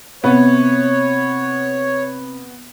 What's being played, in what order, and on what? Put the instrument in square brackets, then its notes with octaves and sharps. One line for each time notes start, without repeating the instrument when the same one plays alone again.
[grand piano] C3 [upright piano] B3 [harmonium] C#5